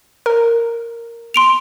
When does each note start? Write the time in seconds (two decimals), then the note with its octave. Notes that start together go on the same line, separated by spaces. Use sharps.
0.26 A#4
1.34 C6 D7 F7